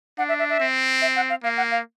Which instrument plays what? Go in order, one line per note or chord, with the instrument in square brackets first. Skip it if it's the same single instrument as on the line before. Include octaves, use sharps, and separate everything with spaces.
[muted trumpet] D4 [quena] F#5
[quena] E5
E5
E5
[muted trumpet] C4
[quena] E5
F#5
F5
[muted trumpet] A#3 [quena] F5
[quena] F#5
F5